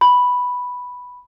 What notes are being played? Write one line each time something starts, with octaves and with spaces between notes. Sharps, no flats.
B5